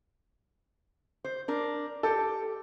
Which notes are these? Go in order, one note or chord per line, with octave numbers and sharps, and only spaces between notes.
C5
D4 A#4
G4 A4